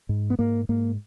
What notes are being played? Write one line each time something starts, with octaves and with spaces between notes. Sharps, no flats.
G#2
B3
G#2 A#3
G#2 A#3